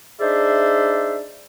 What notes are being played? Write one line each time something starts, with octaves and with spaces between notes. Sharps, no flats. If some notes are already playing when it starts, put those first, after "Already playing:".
D4 D#4 G#4 C5 D5 E5